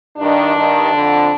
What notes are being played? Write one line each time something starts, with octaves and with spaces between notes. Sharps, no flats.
G2 D#3 D4
G2 D#3
F2 D3